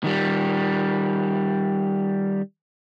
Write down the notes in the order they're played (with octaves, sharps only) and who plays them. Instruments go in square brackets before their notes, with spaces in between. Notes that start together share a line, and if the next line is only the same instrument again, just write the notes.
[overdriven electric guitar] D#3 G3